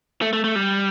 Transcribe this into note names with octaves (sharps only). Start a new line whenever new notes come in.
A3
A3
A3
G3